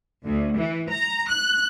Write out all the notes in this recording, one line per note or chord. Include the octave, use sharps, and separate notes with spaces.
D2
E3
A#5
F#6